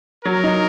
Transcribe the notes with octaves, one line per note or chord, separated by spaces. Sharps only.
F#3 A#4
D#4